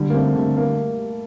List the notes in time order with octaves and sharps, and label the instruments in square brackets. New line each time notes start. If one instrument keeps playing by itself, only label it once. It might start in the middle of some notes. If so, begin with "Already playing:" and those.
Already playing: [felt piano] D3 [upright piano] G3
[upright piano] A#3
[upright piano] A3 [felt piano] C4
[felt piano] D3 [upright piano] A3
[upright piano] A#3